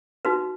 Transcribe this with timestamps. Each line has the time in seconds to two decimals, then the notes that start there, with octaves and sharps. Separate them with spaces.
0.25 D#4 F#4 B4